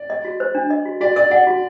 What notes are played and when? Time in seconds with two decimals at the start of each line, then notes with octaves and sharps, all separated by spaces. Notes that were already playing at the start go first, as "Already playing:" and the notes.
Already playing: D5
0.10 D#5
0.25 F#4
0.40 C5
0.55 D4
0.70 D#5
0.85 F#4
1.01 F#4 D5
1.16 A#4 D5
1.31 D5 F#5
1.47 F#4